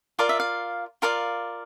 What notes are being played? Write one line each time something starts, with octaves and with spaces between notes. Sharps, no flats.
F4 A#4 D5 F5
E5
F5
F4 A#4 D5 F5